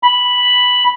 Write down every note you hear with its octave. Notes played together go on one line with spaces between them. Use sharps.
B5